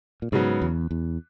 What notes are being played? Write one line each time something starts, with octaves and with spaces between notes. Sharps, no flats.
A#2
G#2 C#3 F#3 B3
E2
E2